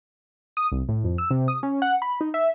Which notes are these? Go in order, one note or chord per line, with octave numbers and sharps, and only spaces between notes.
D#6
C2
A2
F2
E6
C3
D#6
C#4
F#5
B5
D#4
E5